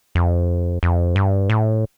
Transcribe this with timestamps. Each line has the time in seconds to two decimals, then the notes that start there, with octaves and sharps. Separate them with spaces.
0.15 F2
0.83 F2
1.16 G2
1.50 A2